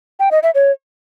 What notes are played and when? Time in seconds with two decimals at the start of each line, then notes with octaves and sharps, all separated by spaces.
0.20 G5
0.31 D#5
0.43 E5
0.55 C#5